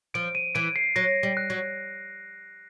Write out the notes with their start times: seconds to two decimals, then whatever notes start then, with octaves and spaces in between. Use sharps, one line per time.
0.14 F3 D7
0.35 D#7
0.55 E3 D7
0.76 C7
0.96 F#3 A#6
1.23 G3
1.37 F#6
1.50 F#3